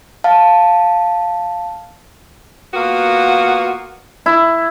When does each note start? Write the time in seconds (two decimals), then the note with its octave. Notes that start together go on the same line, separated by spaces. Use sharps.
0.24 F5 A5
2.74 A#3 B3 F4 F#4 F5
4.26 E4